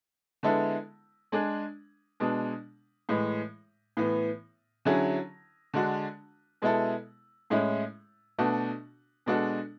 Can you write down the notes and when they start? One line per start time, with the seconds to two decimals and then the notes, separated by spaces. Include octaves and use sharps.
0.43 D3 G#3 B3 E4 A4
1.32 G#3 D4 G#4
2.20 B2 G#3 D4
3.09 A2 E3 G#3
3.97 A2 E3 B3
4.85 D3 F#3 C#4 E4 G#4
5.74 D3 G#3 D4 F#4
6.62 B2 G#3 B3 E4 A4
7.50 A2 G#3 C#4 E4
8.39 B2 A3 D4 F#4
9.26 B2 G#3 D4 F#4 A4